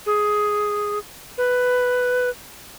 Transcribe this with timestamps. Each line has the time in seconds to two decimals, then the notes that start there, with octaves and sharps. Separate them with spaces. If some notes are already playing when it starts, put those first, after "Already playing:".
0.06 G#4
1.38 B4